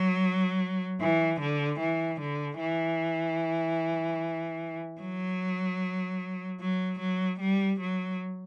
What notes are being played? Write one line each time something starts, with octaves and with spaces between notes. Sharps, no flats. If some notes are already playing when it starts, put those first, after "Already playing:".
Already playing: F#3
E3
D3
E3
D3
E3
F#3
F#3
F#3
G3
F#3